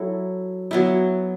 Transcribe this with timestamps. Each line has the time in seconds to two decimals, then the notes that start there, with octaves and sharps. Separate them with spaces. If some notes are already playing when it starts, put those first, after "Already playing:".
Already playing: F#3 E4 A4
0.71 F#3 B3 E4